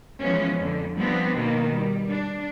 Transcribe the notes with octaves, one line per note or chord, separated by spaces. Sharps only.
E3 F3 G#3 B3 C#4
F2 D3
F3 G3 B3 C4 D4
B2 D#3 A#3
G3
D4